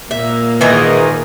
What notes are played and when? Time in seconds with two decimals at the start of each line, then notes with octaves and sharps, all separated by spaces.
0.11 A#2 A#3 E5
0.61 G#2 D#3 E3 G#4 A#4 D#5